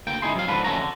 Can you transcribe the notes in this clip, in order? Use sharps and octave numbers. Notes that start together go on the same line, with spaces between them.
D2 A#3 G5
C#2 D#4 E4 G#4 C6
F#3 C4 F5
G#2 D3 F3 B4
F2 D3 A3 C#4 F#4 A#5
D3